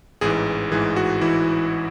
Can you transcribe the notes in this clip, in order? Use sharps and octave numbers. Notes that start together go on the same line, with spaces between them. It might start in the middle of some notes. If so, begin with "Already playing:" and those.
A1 G#2 E3 G#4
A1 G#2 E3 G#4
F#4
A1 G#2 E3 E4